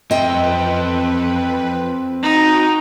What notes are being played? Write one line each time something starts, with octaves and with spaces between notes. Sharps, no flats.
F2 C4 A4 B4 D#5 G5
D#4 F#4 G5